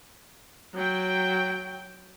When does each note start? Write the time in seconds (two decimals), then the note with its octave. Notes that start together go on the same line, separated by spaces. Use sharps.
0.75 F#3 G5